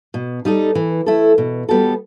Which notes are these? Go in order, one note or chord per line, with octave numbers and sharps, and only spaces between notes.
B2
G3 D#4 A4
E3
A3 E4 A4
B2
G3 B3 F#4 A4